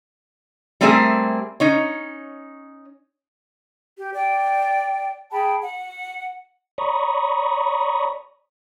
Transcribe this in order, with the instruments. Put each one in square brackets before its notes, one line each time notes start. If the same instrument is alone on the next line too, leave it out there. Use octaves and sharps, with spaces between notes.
[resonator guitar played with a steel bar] G3 A3 A#3 C4 G#4 E5
C#4 D#4 C#5
[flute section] G4
D5 G5
G#4 G5 A5 B5
F#5
[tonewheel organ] C#5 D5 A#5 B5 C#6 D#6